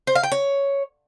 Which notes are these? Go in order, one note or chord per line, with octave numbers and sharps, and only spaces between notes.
C5
F5
G5
C#5